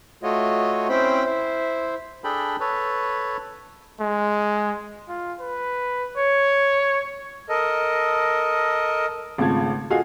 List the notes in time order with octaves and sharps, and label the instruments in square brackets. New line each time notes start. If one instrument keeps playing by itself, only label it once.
[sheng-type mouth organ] A3 F4 F#4 C#5 D#5
C4 C#4 E4 C5 G5 B5
E4 C5
[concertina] D4 G#4 A4 G5 B5
A4 B4 C#5
[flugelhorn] G#3
[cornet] F4
B4
C#5
[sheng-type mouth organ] A4 A#4 D#5
[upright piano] G#1 C#3 A3 F4 A5 G#6
F4 F#4 G#4 A4 D#5 F5